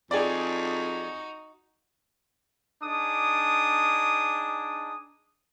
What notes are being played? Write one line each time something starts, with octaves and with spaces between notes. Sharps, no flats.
F2 D#4 F#4 G#4 D5
D4 D#4 G#4 D6 D#6